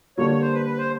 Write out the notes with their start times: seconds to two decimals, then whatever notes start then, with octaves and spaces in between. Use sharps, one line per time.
0.17 D3 G3 A#3 C#5
0.30 C#5
0.41 C5
0.54 B4
0.66 B4
0.78 C5